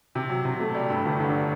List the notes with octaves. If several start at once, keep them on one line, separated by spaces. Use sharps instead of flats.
C3
F#3
C3
A3
G3
G2
G1
D3